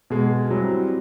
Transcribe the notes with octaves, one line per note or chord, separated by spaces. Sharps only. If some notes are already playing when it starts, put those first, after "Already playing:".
B2 G#3
F#3 G3 C4 E4